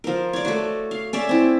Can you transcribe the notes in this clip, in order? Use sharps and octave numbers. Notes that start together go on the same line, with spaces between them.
F3 A#4
C#5 D5
A3 F#4
F5
C#4 D5 E5
C4 E4